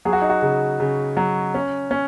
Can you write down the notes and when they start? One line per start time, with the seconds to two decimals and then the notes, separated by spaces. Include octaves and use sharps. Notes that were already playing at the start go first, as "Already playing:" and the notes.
0.05 F#3 G#4
0.13 F#4
0.22 D#4
0.29 F#4
0.42 C#3
0.80 C#3
1.17 F#3
1.54 C#4
1.91 C#4